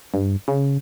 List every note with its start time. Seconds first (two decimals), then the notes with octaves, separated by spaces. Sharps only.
0.14 G2
0.48 C#3